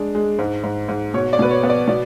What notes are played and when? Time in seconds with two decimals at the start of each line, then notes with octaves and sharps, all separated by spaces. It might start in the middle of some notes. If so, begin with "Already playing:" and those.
Already playing: G#3 D4
0.15 G#3
0.39 G#2
0.64 G#2
0.88 G#2
1.14 B2 C#5
1.33 D5
1.39 B2 B4
1.51 C#5
1.63 B3
1.70 D5
1.88 B2 D5